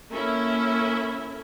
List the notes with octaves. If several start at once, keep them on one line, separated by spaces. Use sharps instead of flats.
A#3 C#4 E4 A4 E5